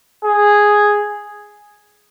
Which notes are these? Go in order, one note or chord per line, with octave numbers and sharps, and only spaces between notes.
G#4